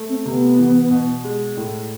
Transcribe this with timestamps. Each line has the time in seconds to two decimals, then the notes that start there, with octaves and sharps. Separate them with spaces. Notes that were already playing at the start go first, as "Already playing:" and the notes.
Already playing: A3
0.09 C4
0.25 C3 B3
0.58 E3
0.91 B2
1.24 G#3
1.57 A2